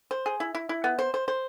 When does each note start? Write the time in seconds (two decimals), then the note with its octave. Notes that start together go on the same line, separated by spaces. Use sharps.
0.11 C5
0.26 G#4
0.40 E4
0.55 E4
0.69 E4
0.84 B3
0.99 C5
1.14 C5
1.28 C5